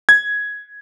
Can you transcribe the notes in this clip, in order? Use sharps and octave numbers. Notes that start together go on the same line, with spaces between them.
G#6